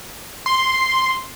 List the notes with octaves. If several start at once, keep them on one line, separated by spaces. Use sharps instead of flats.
C6